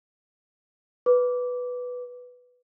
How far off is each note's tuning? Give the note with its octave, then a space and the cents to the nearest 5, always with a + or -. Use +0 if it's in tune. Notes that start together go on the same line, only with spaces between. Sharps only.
B4 +0 D6 -15